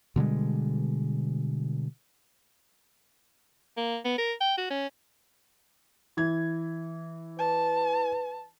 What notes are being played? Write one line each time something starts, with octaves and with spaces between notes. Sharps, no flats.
B2 D3 G3 G#3
A#3
B3
A#4
G5
F#4
C#4
E3 G#6
B4 A5